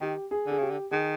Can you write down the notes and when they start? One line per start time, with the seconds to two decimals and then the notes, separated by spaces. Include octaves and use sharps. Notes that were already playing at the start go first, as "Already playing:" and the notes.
0.01 D#3 G4
0.31 G#4
0.46 D3
0.51 G#4
0.58 C#3 G4
0.70 D3
0.91 D#3 G#4